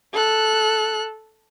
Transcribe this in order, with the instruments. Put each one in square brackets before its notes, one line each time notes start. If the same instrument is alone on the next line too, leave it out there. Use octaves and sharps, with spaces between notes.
[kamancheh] A4 F#6